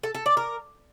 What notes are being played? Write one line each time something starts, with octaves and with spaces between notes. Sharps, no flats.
A4
A4
D5
A#4